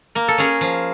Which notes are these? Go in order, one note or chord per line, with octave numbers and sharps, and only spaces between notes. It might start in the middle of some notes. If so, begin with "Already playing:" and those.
A#3 A#4
A4
C#4 G#4 A#4
F3